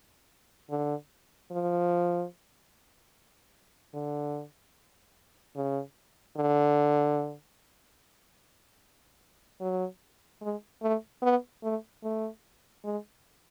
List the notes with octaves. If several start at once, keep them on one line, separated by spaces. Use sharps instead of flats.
D3
F3
D3
C#3
D3
F#3
G#3
A3
B3
A3
A3
G#3